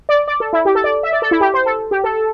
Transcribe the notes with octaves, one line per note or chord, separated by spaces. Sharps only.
D5
D5
A4
E4
G4
A4
D5
E5
D5
A4
E4
G4
C5
A4
G4
A4